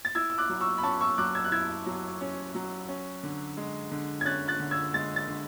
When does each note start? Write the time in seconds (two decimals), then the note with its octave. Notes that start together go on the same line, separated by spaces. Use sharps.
0.05 A6
0.15 E4 E6 G#6
0.30 E6
0.38 D6 F#6
0.50 F#3
0.61 C#6 E6
0.78 B5
0.83 C#4 A5 C#6
1.01 C#6 E6
1.18 F#3 D6 F#6
1.35 E6 G#6
1.44 F#6
1.52 E4 E6 G#6
1.86 F#3
2.21 C#4
2.55 F#3
2.89 C#4
3.23 D3
3.57 G#3
3.91 D3
4.21 G#6
4.25 C#4 F#6 A6
4.48 F#6 A6
4.60 D3
4.71 E6 G#6
4.94 G#3 A6
5.16 A6
5.28 D3